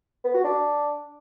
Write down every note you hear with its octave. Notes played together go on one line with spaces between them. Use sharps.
B3
F#4
D4